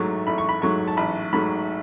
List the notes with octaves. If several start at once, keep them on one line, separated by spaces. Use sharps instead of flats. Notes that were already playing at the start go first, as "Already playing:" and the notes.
Already playing: A1 G#2 F#3 A3
A1 B5
C#6
B5
G#2 F#3 A3 C#6
A5
A1 B5
G#2 F#3 A3 B5